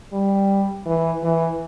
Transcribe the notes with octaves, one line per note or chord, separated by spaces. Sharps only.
G3
E3
E3